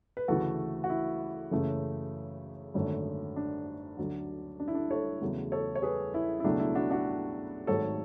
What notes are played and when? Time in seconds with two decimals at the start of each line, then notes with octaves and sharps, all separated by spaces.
0.17 B4
0.28 D2 C#3 E3 A3 F#4 A4
0.84 F#4
0.90 E4
1.51 F#1 F#2 C#3 E3 A3
2.74 G#1 F#2 D3 A3
3.36 D4
3.97 D2 D3 F#3
4.60 D4
4.68 E4
4.75 D4
4.91 A4 C#5
5.21 E2 C#3 F#3 A3
5.52 A4 C#5
5.75 C#5
5.83 G#4 B4
6.14 E4
6.40 E4
6.44 C#2 B2 F#3 A3 D4
6.60 E4
6.75 D4 F#4
6.90 D4 F#4
7.67 G#1 G#2 F#3 A3 A4 C#5